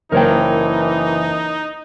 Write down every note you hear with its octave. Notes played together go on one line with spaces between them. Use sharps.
F#1 E3 D#4 A#4 C#5 G5